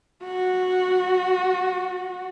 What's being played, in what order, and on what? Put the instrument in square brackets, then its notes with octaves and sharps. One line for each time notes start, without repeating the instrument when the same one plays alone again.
[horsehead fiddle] F#4